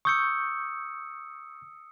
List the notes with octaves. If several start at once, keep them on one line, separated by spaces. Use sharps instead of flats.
C#6 D#6 E6 G6 C#7